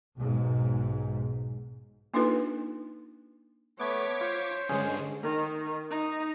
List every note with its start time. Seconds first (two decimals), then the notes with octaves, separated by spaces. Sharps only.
0.18 B1 G#2
2.14 A#3 D4 D#4 F4 A4 B4
3.80 A3 B3 B4 C#5 D6 G#6 B6
4.21 F4 C5
4.69 G2 D3 G#3 C#4 G#4
5.23 D#3
5.91 D#4